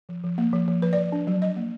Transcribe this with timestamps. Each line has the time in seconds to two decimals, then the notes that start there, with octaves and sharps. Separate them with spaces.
0.09 F3
0.24 F3
0.38 A#3
0.53 F3
0.68 F3
0.82 F3 B4
0.93 D5
0.97 F3
1.12 D4
1.27 F#3
1.42 F#3 D#5
1.57 A#3